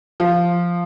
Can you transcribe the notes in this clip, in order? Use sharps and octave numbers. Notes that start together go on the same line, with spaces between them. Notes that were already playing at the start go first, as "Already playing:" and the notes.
F3